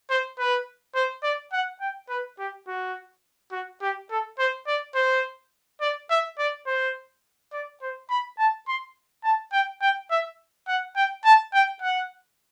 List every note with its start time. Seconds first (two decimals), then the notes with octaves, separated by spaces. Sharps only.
0.10 C5
0.39 B4
0.95 C5
1.23 D5
1.53 F#5
1.81 G5
2.09 B4
2.39 G4
2.67 F#4
3.52 F#4
3.82 G4
4.10 A4
4.39 C5
4.67 D5
4.95 C5
5.81 D5
6.10 E5
6.39 D5
6.67 C5
7.53 D5
7.82 C5
8.10 B5
8.39 A5
8.68 C6
9.24 A5
9.53 G5
9.82 G5
10.11 E5
10.68 F#5
10.96 G5
11.25 A5
11.54 G5
11.82 F#5